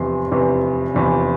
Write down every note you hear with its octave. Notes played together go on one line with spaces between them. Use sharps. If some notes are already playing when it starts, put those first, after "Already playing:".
Already playing: F1 E2 C3 E3 C6
F1 E2 C3 E3
F1 E2 C3 E3